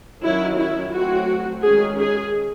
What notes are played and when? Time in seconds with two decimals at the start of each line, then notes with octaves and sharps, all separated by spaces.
0.22 D#3 F#3 C#4 E4
0.57 E4
0.92 F#3 A3 C4 F#4
1.63 D#3 G#3 C#4 G#4
1.99 G#4